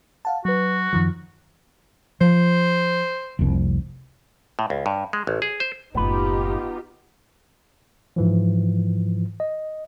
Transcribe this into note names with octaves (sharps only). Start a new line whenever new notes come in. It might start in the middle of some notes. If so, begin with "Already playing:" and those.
F5 F#5 A5
F#3 F#4 B4
F#2 D#3 F3
F3 C5
F1 C2
A2
C#2
G2
G#3
A1
G#4
C5
F#1 A2 B3 D#4 F4 G4 B4
G#2 E3 F3
D#5